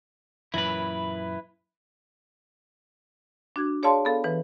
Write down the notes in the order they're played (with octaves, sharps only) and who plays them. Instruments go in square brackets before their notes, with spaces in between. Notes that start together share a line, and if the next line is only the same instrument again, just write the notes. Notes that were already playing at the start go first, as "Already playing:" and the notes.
[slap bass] F#2 A#2 E3 [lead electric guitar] E4 B4
[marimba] D4 F#4 G#6
G#4 C#5 D5 F5 A5 C6
B3 A4 F5
E3 B4